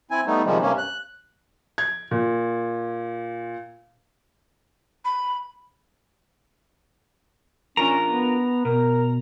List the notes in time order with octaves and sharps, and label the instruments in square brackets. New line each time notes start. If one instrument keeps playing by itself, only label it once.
[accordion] C4 E4 G#5
G3 A3 B3 D#4
C3 D#3 F3 G3 G#3
G2 C3 A#3 C#4
F#6
[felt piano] G#6
A#2
[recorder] B5
[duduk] C#4 [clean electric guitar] D4 F4 A#4 [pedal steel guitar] A#5
[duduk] B3
[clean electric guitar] B2 [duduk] A#4